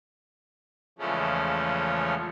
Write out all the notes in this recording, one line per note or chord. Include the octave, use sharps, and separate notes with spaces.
E2 C#3 F3 G#3 A3 C#4